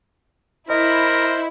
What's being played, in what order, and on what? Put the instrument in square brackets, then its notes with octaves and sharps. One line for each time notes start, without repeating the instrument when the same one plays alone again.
[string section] E4 [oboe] A#4 [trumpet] C5 [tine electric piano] D#5